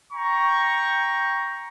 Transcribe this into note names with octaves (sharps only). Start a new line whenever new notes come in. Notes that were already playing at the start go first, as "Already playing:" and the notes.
G5 A#5 C#6